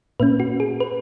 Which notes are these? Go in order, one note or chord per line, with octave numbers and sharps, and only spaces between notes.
A#2 A#3 C#4 B4
F#4
G#4
B4